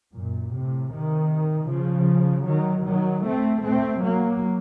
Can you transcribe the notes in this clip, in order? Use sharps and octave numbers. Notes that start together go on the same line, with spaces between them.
F#2 A#2
A2 C3
C3 D#3
C#3 F3
D#3 F#3
D#3 F#3
A3 C4
A3 C4
F#3 A#3